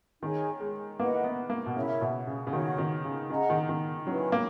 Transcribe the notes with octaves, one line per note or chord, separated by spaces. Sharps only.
D#3 D#4 G#4 C#5 G#5
G#3
A#3 E4 B4 D#5 F#5
B3
A#3
B2
C#3 E4 A#4 C#5 E5
B2
C#3
C#3
D#3 F#4 C#5 F#5
D#3
C#3
C#3 G#4 D#5 F#5 A#5
D#3
D#3
F#3 C#4 E4 B4
A#3